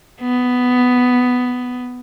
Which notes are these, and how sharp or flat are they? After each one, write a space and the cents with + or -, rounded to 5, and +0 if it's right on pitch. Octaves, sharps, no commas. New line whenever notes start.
B3 +10